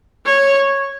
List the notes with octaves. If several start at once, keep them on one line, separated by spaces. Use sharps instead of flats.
C#5